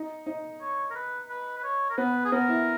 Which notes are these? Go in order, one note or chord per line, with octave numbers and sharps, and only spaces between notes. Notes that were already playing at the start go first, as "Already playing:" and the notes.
Already playing: D#4
D#4
C#5
A#4
B4
B4
B4
C#5
A#4
B3 B4
G#4
B3 A#4
E4